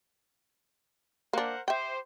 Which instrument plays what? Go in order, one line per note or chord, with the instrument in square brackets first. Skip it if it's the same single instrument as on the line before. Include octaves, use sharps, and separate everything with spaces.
[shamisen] A#3 D4 [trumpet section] A#4 C5 F#5
[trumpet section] G4 C5 [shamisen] E5 G5